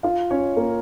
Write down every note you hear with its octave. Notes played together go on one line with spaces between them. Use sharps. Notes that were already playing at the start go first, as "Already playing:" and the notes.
F4 F5
C#4 C#5
A#3 A#4